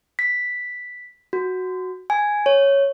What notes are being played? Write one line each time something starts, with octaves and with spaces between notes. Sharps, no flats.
B6
F#4
G#5
C#5